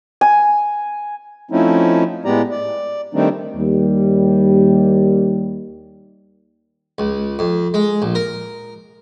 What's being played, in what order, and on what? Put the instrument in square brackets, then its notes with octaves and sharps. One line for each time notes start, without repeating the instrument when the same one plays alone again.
[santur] G#5
[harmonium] F3 A3 C4 C#4 D#4 E4
A2 G#3 B3 G4 D5 A#5
D5
D#3 G3 A3 C4 D4 D#4
[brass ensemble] D#2 G3
[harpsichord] C#2
F2
G#3
A#1
A#4